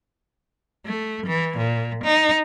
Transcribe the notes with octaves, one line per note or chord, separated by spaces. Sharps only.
A3
E3
A#2
D#4